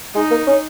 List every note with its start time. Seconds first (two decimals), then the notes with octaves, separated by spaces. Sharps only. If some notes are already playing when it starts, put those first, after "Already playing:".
0.15 G#3 D#4
0.31 A#3
0.47 C#4